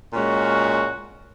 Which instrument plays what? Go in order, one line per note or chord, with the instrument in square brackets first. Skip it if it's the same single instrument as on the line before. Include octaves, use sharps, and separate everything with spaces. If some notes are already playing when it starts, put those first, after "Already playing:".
[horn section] A#2 G#3 C#4 F#4